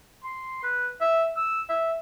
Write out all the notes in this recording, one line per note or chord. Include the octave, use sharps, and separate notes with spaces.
C6
B4
E5
E6
E5